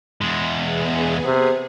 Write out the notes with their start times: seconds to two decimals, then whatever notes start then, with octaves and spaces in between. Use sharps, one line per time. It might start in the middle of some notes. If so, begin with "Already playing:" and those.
0.21 E2 G#3
0.55 B3 G#4
1.25 C3